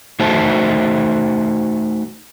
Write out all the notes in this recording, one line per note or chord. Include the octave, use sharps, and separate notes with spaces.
A3 D#4 F#4 C5 E5 A5